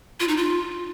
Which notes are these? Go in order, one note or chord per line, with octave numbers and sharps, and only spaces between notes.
F4
D#4
F4